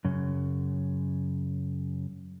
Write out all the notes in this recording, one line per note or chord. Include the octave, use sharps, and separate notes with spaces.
F#2 C#3